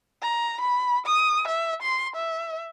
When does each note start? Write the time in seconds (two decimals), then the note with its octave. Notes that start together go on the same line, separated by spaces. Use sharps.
0.23 A#5
0.61 B5
1.06 D#6
1.48 E5
1.82 C6
2.16 E5